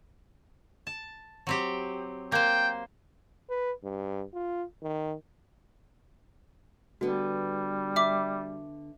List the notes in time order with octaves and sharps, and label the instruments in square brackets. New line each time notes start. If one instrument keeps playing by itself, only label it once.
[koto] A5
F#3 C4 G4
[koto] A#3 C5 [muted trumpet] G5
[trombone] B4
G2
F4
D#3
[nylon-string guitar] D3 B3 [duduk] G3 [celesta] F#4
[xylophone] E5 D6